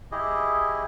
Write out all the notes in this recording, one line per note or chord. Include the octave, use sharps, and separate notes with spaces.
E4 G4 G#4 D#5